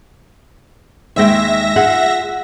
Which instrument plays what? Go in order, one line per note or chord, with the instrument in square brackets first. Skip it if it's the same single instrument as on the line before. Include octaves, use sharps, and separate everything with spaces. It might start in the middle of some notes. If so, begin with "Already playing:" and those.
[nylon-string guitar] D#2 G#3 G5 [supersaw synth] E5 A#6
[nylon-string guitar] F4 G#4 F#5